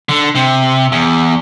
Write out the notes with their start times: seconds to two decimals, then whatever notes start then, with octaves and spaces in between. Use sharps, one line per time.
0.09 D3
0.35 C3
0.92 E2